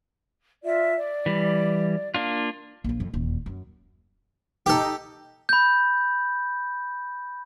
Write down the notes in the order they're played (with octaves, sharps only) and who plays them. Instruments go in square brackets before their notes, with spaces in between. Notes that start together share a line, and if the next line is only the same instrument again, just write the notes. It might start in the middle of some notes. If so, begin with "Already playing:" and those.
[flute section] F4 D5 E5
D5
[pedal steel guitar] E3 G3
A#3 D4 F4
[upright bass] A#1 F3
F2
D#1 E2
F#2
[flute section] D#4 [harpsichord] G4 A4
[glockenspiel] B5 G6